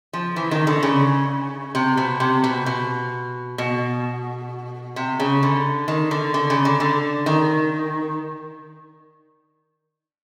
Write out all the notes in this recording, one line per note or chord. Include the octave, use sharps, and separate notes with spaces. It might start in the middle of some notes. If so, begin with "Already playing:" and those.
F3
E3
D#3
D3
C#3
C3
B2
C3
B2
B2
B2
C3
C#3
D3
D#3
D3
D3
C#3
D3
D3
D#3